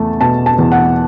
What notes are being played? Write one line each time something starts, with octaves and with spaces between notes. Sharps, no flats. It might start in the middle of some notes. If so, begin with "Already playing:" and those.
Already playing: E2 A3 A5
B2 A5
A5
E2
F#5